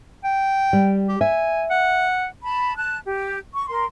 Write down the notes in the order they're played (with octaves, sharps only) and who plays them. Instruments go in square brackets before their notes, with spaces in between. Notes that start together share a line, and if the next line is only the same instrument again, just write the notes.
[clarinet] G5
[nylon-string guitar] G3
[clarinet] G4
[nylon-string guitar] E5 [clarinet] G#5
[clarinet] F#5
[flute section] A5 B5
A5 F#6
G4
C#6
A#4 C6